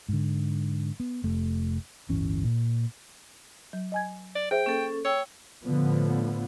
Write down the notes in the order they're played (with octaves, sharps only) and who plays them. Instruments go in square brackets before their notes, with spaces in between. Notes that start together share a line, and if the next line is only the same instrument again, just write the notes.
[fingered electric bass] G#2 D3
B3
F1 A3
D1 G1 E3 C#4
A#2
[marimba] F#3
D#5 G#5 G#6
[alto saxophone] D5
[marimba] G#4 C5 E5 [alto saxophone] G5
[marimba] A#3 [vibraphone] C#4 A4
[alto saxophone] C#5 [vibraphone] G5 E6
[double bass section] A2 D3 F3 B3